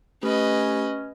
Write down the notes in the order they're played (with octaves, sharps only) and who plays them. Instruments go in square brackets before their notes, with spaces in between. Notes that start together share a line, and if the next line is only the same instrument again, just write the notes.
[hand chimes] A3 G4 [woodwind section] C#4 [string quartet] B4 D#5